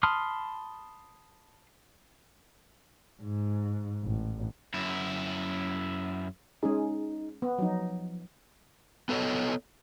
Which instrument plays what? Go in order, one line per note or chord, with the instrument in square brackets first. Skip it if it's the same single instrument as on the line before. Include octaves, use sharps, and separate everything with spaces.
[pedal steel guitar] A5 B5 C6 D#6 F6
[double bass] G#2
A1
[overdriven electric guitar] F#2 E4
[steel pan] G#3 C#4 G#4 [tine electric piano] D#4
[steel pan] B3
[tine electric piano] F3 [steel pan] F#3 D#4
[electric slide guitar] B3 A4 B4 C#5 D#5